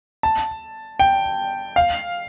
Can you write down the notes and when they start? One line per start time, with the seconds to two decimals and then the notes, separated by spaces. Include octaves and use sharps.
0.23 A5
0.99 G5
1.76 F5